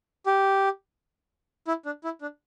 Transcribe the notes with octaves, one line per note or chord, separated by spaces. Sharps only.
G4
E4
D4
E4
D4